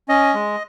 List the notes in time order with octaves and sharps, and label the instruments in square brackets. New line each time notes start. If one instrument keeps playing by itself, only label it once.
[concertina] C#4 D#5
G#3